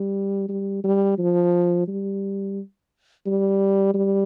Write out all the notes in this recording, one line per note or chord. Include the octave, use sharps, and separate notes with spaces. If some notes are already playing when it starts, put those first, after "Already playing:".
Already playing: G3
G3
G3
F3
G3
G3
G3